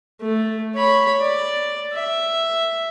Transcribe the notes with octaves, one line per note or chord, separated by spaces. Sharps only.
A3
C#5 B5
D5
E5